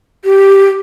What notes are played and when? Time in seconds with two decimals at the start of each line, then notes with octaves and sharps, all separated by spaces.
0.24 G4